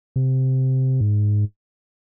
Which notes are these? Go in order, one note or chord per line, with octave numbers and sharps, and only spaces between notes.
C3
G#2